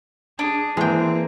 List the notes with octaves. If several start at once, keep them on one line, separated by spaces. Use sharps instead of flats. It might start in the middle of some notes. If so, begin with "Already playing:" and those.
D4 G#4
E3 G#3 A#3 C4 G5